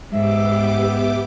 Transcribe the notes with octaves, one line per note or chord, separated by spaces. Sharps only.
G#2 G#3 B3 G4 E5 D6